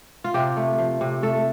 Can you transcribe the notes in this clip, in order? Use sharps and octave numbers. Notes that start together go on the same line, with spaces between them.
F4
C3 G4
A3
F3
C3
A3 A4